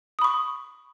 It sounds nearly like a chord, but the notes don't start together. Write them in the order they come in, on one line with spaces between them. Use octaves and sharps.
D#6 B5 C#6